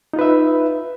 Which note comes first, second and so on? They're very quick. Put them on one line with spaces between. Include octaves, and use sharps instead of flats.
D#4 F4 B4 E5